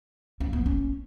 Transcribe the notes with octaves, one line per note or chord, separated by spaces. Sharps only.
C#4
B3
C#4